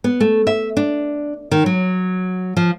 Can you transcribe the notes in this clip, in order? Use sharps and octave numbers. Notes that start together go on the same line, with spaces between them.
B3
A3
E5
D4
D#3
F#3
F3